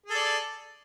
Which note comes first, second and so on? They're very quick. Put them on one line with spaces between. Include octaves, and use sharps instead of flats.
G#4 A4 D5